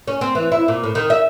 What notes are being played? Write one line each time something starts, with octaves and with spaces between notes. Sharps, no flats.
C#4
C4
E3
E4
A#2
A2
D#3
E5